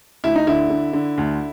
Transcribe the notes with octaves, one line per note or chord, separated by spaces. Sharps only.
D2 E4
D#4
D3 E4
D3
D3
D2